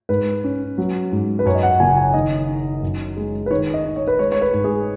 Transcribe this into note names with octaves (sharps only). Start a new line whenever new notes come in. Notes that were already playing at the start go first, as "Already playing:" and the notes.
G#2 B4
C#4
F#3
G#2
B4
F#2 C#5
D#5
F#5
F#1 G#5
G#5
D#3 D#5
D#4
F#2
G#3
B4
D#3 C#5
D#5
D#4
C#5
B4
G#3 C#5
C#5
B4
G#2
G#4